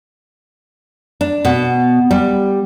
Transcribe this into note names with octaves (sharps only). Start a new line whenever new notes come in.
D4
B2
G3